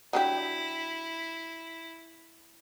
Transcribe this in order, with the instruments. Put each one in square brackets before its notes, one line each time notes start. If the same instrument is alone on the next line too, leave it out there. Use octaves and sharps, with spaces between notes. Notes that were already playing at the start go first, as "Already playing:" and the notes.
[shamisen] F#3 D4 G4 [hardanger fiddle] E4